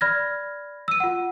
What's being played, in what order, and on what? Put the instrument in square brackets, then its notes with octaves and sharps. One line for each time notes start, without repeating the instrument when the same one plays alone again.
[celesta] D5 B5 F6 G#6 A#6
E6 D#7
F4 F#5